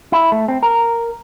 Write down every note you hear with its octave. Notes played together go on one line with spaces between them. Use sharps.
E4
A3
C4
A#4